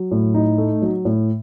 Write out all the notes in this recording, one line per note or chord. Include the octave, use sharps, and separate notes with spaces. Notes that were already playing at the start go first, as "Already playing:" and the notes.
Already playing: F#3
A2
D#4
A3
F#3
A2